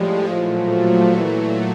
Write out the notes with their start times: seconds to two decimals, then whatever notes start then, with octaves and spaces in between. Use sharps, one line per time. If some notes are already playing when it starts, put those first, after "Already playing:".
Already playing: A2 F3 G3 G#3
0.29 A#2 F3 F#3 A3
1.16 A#2 E3 F#3 A3